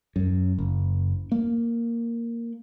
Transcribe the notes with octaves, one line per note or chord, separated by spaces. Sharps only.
F#2
F#1
A#3